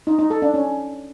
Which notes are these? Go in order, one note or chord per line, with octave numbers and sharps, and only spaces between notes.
D#4
D#4
A4
D4
C#4